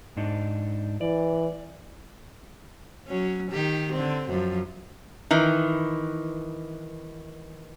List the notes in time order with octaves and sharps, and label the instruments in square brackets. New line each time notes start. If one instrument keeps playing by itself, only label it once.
[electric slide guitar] G#2 D4 D#4
[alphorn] E3 [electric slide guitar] D5
[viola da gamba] F#3 C#4
D#3 G4
D3 C4
F#2 F3
[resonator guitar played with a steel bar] D#3 E3